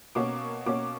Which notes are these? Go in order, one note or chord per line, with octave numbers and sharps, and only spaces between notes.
B2 A#3 C#4 D6
B2 A#3 C#4 D6